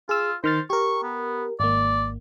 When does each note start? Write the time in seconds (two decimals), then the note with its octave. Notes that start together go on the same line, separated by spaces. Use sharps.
0.09 F4 G#4 E6
0.44 D#3 C5 F6 A6
0.70 G4 A#4 C#6
1.03 B3
1.60 G#1 A#3 D5